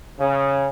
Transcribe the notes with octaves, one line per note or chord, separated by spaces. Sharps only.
C#3